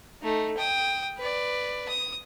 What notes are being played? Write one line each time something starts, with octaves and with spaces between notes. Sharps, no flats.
A3 D#4
G5 D#6
B4 D5
D#6